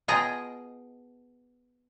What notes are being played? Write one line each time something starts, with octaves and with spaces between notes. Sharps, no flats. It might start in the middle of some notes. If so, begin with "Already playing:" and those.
B2 F4 G#4 D#5 G5 A#5